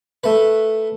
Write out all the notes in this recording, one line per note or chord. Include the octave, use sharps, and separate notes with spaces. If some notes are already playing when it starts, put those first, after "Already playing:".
A3 B4